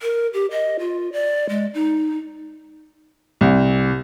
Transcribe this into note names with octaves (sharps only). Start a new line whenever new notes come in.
A#4
G4
D#5
F4
D5
G#3
D#4
C2